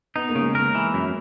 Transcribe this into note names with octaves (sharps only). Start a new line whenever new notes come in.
B3 D#4
A#3
C#3
G#3
A#3 A#4
E3
F#2